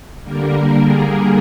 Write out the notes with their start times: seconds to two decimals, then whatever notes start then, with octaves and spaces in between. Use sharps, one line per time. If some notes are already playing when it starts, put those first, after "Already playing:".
0.23 D3 G3 A#3 A#4
0.79 G#4